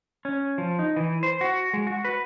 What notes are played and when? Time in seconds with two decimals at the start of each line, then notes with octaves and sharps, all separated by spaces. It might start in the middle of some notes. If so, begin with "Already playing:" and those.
0.25 C#4
0.58 F3
0.79 D#4
0.96 E3
1.23 C5
1.41 F#4
1.74 G#3
1.87 F#4
2.05 B4